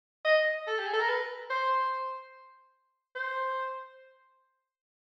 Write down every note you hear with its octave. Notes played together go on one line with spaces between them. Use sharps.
D#5
A4
G4
G#4
A4
A#4
B4
C5
C5